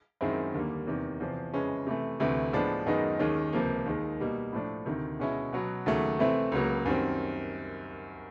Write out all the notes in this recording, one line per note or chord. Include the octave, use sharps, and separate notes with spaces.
F#2 D#3 G#3 C4 E4
D#2 D3 G3 A#3
E2 C3 D#3
E2 C3 F3
F2 C#3 E3 G#3 C#4
C3 E3 A3
D2 C3 E3 A3
A2 F3 G#3 B3 D4
F#2 D#3 G#3 B3 D#4
D#2 D#3 G#3 C#4
C#2 C3 F3 A#3
D#2 D#3 G#3
B2 G3 A#3 D#4
A2 F3 A3 D4
D2 C3 D#3
B2 G#3 C#4 E4
B2 F#3 B3
D#2 C#3 F#3 A3
C3 E3 A3 C4 E4
C#2 C#3 F#3 A#3
F#2 D#3 G3 C4